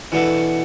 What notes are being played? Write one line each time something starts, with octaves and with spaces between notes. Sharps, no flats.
B2 E3 B3 D4 F#4 A4